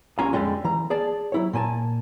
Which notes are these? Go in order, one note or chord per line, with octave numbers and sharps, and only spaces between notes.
C2 A#3 C#4 F4 G#5 A#5
F2 D3 D#3 G3 G#3
E3 A#5
G#4 D5 A5
F#3 E4 C#5
A#2 A#3 G#5 A5